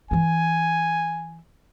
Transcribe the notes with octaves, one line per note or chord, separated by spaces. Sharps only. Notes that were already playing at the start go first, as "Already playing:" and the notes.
E3 E4 G#5